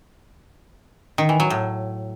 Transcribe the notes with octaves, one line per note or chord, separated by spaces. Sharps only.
D#3
E3
F#3
A2